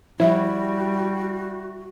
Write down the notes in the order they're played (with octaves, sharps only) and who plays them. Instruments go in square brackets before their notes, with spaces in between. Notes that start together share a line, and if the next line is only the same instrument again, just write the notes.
[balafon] F3 E5 [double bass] G3 [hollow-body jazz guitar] E4 [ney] F#4